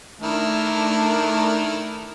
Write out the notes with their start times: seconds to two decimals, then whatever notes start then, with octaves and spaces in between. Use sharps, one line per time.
0.21 D#3 A3 D4 E4 A#4